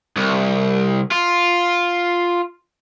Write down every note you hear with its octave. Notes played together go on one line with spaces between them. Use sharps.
C2
F4